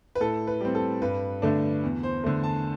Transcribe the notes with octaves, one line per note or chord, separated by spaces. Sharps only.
B4
A2 A4
B4
G3 C4
A4
G2 B4
D3 A3 D4
E2
C5
D3 A3
A5